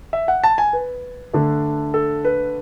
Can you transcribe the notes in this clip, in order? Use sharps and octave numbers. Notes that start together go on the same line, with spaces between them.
E5
F#5
A5
G#5
B4
D3 A3 D4
A4
B4